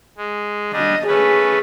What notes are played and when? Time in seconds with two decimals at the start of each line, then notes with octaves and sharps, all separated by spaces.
0.17 G#3
0.73 G3 D4 D#5
1.07 A3 C#4 G#4 B4